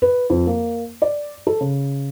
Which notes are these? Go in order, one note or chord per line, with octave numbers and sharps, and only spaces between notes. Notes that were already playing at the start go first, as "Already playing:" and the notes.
B4
F2
A#3
D5
A4
C#3